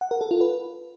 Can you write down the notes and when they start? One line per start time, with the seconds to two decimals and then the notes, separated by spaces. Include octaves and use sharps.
0.01 F#5
0.11 A#4
0.21 A4
0.31 F4
0.41 B4